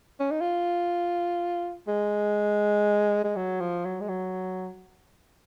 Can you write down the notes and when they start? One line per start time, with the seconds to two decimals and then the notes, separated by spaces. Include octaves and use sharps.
0.19 C#4
0.31 D#4
0.41 F4
1.88 G#3
3.24 G#3
3.36 F#3
3.60 F3
3.85 F#3
4.01 G#3
4.08 F#3